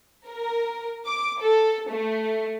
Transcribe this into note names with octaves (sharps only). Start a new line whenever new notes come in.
A#4
D6
A4
A3